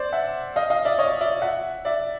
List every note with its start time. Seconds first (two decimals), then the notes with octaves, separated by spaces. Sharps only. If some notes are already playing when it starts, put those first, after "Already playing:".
Already playing: C5 D5
0.13 E5 F#5
0.56 D#5 F5
0.70 D#5 F5
0.85 D5 E5
0.98 C#5 D#5
1.21 D5 E5
1.42 E5 F#5
1.85 D5 E5